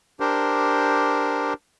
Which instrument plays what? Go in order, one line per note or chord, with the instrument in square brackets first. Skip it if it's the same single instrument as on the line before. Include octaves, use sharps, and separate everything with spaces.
[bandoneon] D4 G4 A#4 C5